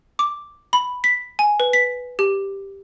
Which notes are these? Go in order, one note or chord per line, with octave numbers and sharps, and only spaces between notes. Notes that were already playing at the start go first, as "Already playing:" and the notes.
D6
B5
B6
G#5
B4
B6
G4